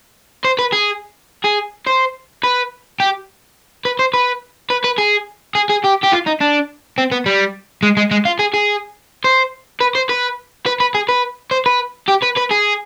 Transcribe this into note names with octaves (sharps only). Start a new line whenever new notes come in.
C5
B4
G#4
G#4
C5
B4
G4
B4
C5
B4
B4
B4
G#4
G#4
G#4
G4
G4
F4
D#4
D4
C4
B3
G3
G#3
G#3
G#3
F4
G#4
G#4
C5
B4
C5
B4
B4
B4
G#4
B4
C5
B4
G4
B4
B4
G#4